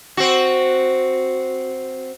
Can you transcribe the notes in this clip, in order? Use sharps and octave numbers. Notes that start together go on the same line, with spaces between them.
C4 F#4